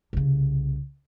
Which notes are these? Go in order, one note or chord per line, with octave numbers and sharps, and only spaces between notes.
C2 C#3